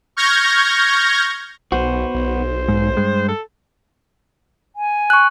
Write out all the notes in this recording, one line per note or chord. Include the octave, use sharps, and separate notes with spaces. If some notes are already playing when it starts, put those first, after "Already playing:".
C#6 F6 G6 G#6 A#6
B1 B3 F#4 C5
B1
G#2
G2 G#3
A4
G#5
C#6 F#6